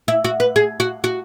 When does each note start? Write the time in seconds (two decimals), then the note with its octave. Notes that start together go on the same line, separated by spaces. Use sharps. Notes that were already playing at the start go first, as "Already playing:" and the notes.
0.08 E4
0.24 F#4
0.40 B4
0.56 G#4
0.80 F#4
1.04 F#4